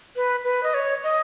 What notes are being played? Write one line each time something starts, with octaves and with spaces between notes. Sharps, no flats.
B4
B4
D#5
C#5
D#5